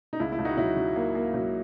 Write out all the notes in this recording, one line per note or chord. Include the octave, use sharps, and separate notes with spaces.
D#4
C#2 E4
E4
C#2
D#4 F#4
F#3 E4
F#3
A#3
A#3
F#3